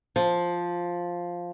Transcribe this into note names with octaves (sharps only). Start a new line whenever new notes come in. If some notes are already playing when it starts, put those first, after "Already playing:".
F3